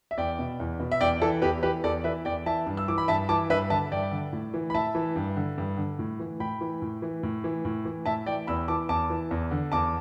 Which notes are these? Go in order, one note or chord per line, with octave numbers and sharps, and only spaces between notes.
E5
E2 D5 G5
B2
E2
B2
E5
E2 D5 G5
E3 A4
E2 G4 B4
E3 G4 B4
E2 A4 D5
E3 B4 E5
E2 D5 G5
E3 E5 A5
G2
E6
E3 D6
B5
G2 E5 A5
E3 A5 D6
G2 B4 E5
D3 E5 A5
G2 D5 G5
D3
A2
E3
B5
A2 E5 A5
E3
G2
D3
G2
D3
A2
E3
A2 G5 B5
E3
A2
E3
A2
E3
A2
E3
A2 E5 A5
E3 D5 G5
E2 B5 E6
E3 A5 D6
E2 A5 D6
E3
E2
D3
E2 A5 D6